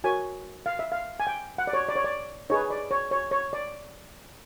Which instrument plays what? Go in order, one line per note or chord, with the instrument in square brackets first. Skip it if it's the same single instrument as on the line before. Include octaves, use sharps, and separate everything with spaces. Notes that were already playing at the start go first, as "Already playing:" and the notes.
[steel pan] F#4 A#4 C#5 G#5
F5
E5
F5
G#5
G5
F#5
D5
C#5
D5
C#5
D5
D#4 G#4 B4 C#5
D5
C#5
C#5
C#5
D5